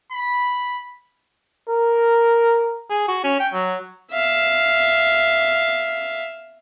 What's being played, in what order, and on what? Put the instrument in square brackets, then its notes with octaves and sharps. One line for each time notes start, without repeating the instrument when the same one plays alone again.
[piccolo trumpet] B5
[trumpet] A#4
[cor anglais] G#4
F#4
C#4
G5
F#3
[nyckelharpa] E5 F5